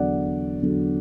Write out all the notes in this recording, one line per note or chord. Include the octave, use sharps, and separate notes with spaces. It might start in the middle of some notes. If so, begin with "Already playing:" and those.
Already playing: E2 D3 F#3 D5 F#5
E2 D3 F#3